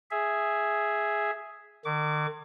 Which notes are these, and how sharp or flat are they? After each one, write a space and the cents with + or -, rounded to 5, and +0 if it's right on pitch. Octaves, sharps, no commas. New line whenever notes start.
G#4 +0 E5 +0
D#3 -45 D6 -30